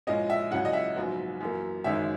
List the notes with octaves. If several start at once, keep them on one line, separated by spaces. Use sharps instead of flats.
A#1 A#2 G#3 C#4 E4 D#5
E5
C#2 C#3 F#3 C#4 E4 F#5
D#5
E5
A#1 G#2 F#3 B3
F#2 E3 A#3
F#1 F#2 D#3 G#3 C#4 E5